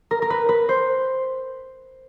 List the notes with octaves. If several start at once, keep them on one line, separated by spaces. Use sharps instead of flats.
A#4
A#4
B4
B4
C5